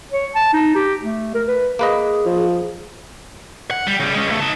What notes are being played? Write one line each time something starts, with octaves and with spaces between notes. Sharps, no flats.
C#5
A5
D#4
G4
A3
A#4
B4
A#3 G#4 B4 D#5
F3
F#5
G3
C#3 G3
G#3 C#4
C#2 A3
D#4 A5